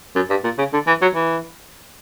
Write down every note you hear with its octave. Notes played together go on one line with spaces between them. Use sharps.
F#2
G2
A#2
C#3
D3
E3
F#3
E3